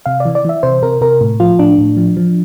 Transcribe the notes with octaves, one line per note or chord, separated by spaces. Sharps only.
C3 F5
E3 D5
D5
E3 E5
C3 C5
C3 A#4
C3 A#4
A2
F3 F4
A2 D4
A2
F3
F3